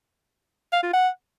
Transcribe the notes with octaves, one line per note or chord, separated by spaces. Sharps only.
F5
F4
F#5